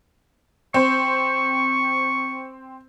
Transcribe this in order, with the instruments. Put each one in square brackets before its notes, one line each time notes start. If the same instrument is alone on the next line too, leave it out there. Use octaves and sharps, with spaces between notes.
[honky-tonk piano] C4 C5 [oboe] C#6